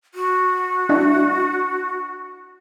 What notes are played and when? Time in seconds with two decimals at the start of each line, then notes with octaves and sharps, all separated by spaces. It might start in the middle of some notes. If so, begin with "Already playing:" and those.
0.14 F#4
0.89 D4 E4 D#5